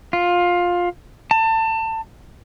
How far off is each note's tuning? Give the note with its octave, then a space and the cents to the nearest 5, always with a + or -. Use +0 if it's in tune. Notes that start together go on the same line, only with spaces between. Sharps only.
F4 +15
A5 +25